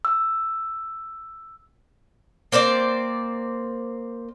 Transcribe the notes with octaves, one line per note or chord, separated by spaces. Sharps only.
E6
A#3 C4 C5 D5